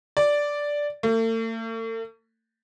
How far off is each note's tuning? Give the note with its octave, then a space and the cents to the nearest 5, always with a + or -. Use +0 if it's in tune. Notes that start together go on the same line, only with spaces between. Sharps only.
D5 -5
A3 +45